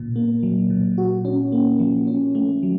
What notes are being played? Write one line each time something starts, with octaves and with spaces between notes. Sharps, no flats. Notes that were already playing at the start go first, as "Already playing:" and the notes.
Already playing: A#2
A#3
F#3
A#2
F#4
C#4
A#3
F3
C#4
A3
F#3